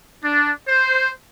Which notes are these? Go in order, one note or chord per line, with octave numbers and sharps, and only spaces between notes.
D4
C5